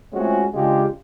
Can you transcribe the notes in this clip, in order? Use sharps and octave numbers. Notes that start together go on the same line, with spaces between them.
G#3 A3 C4 C#4 F4 F#4
C#3 G#3 D4 F4 G4